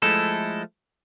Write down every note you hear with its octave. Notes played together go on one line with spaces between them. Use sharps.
F3 G#3 A3 E4 A4